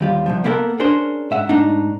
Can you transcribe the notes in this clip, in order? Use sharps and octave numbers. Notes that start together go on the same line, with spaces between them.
D#2 G3 F4
C2 G#2 F3
A#3 B3 E4 F4 A4 A#4
C#4 D4 G#4 A#4 C5
G#2 E5 F#5
G#2 A3 D4 D#4